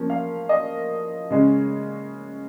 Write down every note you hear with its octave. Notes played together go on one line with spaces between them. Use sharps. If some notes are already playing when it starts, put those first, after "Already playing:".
Already playing: F3 A#3 C#4
F5
D#5
C#3 G#3 C#4